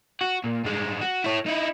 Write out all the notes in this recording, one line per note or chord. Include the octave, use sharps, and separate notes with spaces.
F#4
A#2
G2 G#3
F#4
E4 C#5
D#4 E4